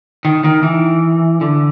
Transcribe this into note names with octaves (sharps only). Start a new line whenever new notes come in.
D#3
D#3
E3
D3